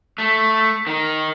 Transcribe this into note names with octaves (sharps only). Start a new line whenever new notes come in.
A3
D#3